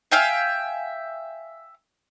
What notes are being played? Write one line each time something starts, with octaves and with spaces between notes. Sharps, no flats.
E5 F5 G5 G#5